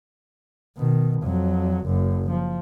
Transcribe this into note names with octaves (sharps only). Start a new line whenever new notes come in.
B2 D#3
F2 F#3
F#1 F#2
F3